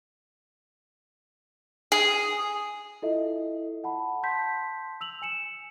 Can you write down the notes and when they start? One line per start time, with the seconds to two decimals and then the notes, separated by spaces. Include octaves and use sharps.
1.92 G#4
3.02 E4 F4 A4 D#5 E5
3.84 F#5 A5 B5
4.23 A5 C6 G6 B6
5.01 E6 F7 F#7
5.22 G#5 C#7 E7